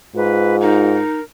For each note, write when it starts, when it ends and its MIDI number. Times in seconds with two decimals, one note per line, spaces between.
0.16 1.01 44
0.16 1.02 65
0.16 0.56 71
0.62 1.19 63
0.62 1.23 70